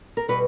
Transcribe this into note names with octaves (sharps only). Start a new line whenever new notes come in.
A#4
B2 G3 B4